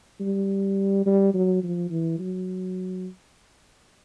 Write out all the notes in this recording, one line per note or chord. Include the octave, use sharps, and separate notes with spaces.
G3
G3
F#3
F3
E3
F#3